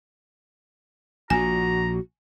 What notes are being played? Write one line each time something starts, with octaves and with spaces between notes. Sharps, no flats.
A#1 A#2 F#4 G#5 A#5